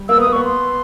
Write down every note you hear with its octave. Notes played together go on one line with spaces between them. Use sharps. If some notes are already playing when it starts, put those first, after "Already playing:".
Already playing: G3
A#3 E6
B3 D#6
A#3
B3 C#6
C6